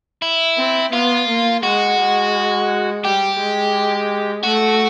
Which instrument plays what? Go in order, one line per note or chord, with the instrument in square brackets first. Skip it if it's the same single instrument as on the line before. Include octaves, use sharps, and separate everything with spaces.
[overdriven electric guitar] E4
[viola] C4
[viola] B3 [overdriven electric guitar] F4
[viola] A#3
[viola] G#3 [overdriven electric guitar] F#4
[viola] G#3
[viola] G3 [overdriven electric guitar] G4
[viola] G#3
[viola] A3 [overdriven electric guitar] F#4